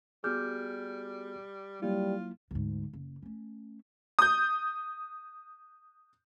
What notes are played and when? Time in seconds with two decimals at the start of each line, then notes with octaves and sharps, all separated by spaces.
0.24 G3 B3 F#4 G#4 D6 F6 G6
1.82 F#3 G3 A#3 E4 F4
2.51 D2 G#2
2.93 F#1
3.22 A3 C#4
4.19 D#6 G6